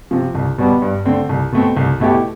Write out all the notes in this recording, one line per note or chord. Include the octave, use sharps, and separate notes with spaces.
C3 F3
C2
B2 G3 B3
G2
D3 A3 C4
C2
B2 A3 C4
C2
B2 A3 E4 G4